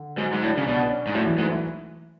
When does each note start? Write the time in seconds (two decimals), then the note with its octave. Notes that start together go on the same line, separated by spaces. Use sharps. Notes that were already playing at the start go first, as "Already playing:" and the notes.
Already playing: D3
0.18 G#2 F#3
0.32 G#2
0.42 A2 D4
0.57 C#3
0.66 B2 D4
0.84 D4
0.90 C#4
1.07 G#2
1.15 A2 F#3
1.26 E3
1.38 G#2 A3
1.52 E4